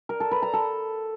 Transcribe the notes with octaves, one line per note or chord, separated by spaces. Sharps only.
A#4
A4
B4
A#5
A4